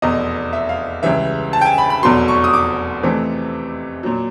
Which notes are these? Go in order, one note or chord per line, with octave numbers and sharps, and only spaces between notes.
F1 E2 B2 D#5
E5
F5
C#2 C#3 E3 G3 E5
A5
G5
G#5
B5
B5
F1 E2 B2 F#3 C6
C#6
D#6
D6
F2 C3 E3 A3 C4
A#2 F#3